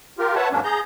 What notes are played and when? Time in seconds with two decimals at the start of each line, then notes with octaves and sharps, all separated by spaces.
0.19 F4 G4 A#4
0.36 B4 C#5 E5 F#5 A5
0.52 E2 G#2 F#3 A#3 C#4 D4
0.64 G#4 A#5 G6